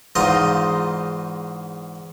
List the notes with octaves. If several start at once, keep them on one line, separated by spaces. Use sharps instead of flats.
E2 G#2 D#4 F4 C6